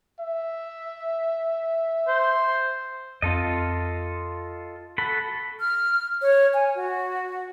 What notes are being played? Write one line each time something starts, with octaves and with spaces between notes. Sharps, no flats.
E5
C5
F2 C4 F4 A4 D#5
F#4 A4 B5
F6
C#5
G#5
F#4